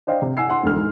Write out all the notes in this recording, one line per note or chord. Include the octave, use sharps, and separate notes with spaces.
D4 C5 D#5 F5 G5
C3
F#5 G#5 E6 C7
F#5 C6
E1 D2 F6
G#2